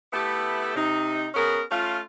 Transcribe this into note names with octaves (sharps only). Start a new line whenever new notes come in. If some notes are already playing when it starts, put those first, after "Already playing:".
A3 B3 E4 G4 A4
C3 D#4
B3 C#4 G#4 A#4
A3 C#4 F4